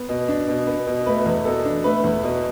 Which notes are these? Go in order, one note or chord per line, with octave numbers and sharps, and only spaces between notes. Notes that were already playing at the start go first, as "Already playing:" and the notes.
Already playing: B3
B2
D4
B2
B3
B2
A3 B4
E2
B2 A4
D4
A3 B4
E2
B2